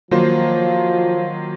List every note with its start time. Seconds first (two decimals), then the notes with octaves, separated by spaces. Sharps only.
0.11 D#3 F3 F#3 A#3 F4 C5